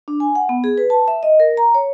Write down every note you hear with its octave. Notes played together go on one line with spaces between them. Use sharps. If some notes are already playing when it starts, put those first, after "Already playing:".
D4
G#5
F#5
B3
G#4
B4
A5
E5
D#5
A#4
A#5
C#5